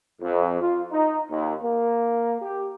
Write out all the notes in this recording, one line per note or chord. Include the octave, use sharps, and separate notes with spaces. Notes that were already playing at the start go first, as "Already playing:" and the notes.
F2
F4
D#4
D#2
A#3
G4